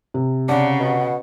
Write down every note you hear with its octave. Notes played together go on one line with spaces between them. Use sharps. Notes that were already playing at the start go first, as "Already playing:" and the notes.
C3
C#3 D4 F#5
B2